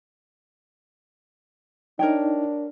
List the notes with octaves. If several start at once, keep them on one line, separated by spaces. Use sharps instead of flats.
D4 D#4 A#4 C#5 G5